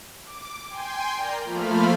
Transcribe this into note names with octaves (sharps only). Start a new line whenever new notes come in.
D6
G5 G#5 C6
A#4 D5 A#5 G6
F3 A3 A#3 F4 B5 F6